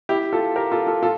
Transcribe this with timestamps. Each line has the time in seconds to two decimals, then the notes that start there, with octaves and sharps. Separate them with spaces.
0.09 E4 G4
0.33 F4 A4
0.56 G4 A#4
0.72 F4 A4
0.87 F4 A4
1.03 F4 A4